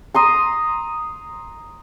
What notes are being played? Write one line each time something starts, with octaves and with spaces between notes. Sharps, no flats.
A#5 C6 D#6